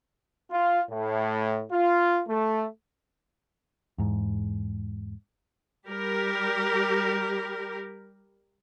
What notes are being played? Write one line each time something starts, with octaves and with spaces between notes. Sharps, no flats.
F4
A2
F4
A3
E2 G#2
G3 G4 A#4